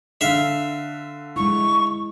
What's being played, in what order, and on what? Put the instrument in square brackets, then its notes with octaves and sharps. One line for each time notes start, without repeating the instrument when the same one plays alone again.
[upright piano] D3 [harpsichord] E5 F5
[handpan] G#3 E4 [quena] C#6